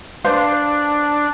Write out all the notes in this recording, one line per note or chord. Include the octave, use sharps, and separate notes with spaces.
D4 B4 C5 F5